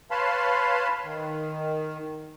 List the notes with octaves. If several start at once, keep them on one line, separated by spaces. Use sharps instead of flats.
B4 C#5 F5 A5 B5 C6
D#3